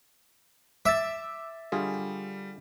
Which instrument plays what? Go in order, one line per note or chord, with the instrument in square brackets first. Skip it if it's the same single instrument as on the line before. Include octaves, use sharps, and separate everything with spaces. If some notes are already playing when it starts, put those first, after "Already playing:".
[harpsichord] E5 [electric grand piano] D6 E6 A6
[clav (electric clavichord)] D3 F4 G#4 [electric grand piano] G3